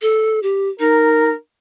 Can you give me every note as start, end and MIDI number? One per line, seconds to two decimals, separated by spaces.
0.02 0.40 69
0.43 0.69 67
0.80 1.31 63
0.80 1.32 70